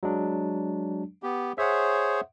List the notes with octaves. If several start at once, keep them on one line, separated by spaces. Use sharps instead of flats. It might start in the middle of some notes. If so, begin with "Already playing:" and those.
F#3 G#3 D4
B3 G4
G#4 C5 C#5 E5 F#5